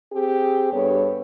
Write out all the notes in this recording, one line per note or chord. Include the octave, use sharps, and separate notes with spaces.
C4 G4 G#4
G2 B3 A4 C#5